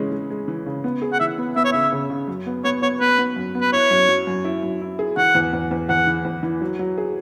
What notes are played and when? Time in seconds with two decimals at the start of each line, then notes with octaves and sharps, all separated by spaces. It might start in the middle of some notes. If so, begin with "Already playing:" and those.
Already playing: C#3 E3 G#3 C#4
0.12 G#3
0.30 G#3
0.48 E3
0.66 C#3
0.84 B3
1.02 G#4
1.13 F#5
1.20 E3 E5
1.38 B3
1.56 B3 E5
1.65 C#5
1.72 C#3 E5
1.92 C#3
2.10 C#3
2.28 F#2
2.46 B3
2.64 B3 C#5
2.82 B3 C#5
3.00 B3 B4
3.18 B3
3.36 F#2
3.55 B3
3.61 B4
3.73 E4 C#5
3.91 F#2
4.09 F#3
4.27 F#2
4.45 E4
4.63 F#2
4.81 E4
4.99 G#4
5.17 E3 F#5
5.35 E2
5.53 E2
5.71 E2
5.89 E2 F#5
6.07 E3
6.25 E2
6.43 E3
6.61 F#3
6.79 F#3
6.98 G#4